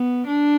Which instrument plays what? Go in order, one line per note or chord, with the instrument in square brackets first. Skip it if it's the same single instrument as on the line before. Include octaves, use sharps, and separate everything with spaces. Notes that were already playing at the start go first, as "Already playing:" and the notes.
Already playing: [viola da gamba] B3
D4